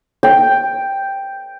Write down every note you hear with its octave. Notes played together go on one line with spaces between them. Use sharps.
G5